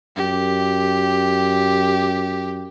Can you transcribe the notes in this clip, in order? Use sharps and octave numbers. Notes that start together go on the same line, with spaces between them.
F#2 G4